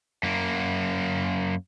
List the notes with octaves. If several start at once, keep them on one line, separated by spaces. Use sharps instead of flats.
F#2 A#3